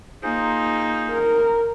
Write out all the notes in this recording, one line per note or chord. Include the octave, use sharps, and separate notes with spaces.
A#3 D#4 F4 G#4 C5
A#4